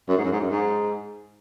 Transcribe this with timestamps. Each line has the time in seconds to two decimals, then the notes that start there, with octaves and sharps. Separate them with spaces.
0.09 F#2
0.17 G#2
0.25 F#2
0.32 G#2
0.40 F#2
0.51 G#2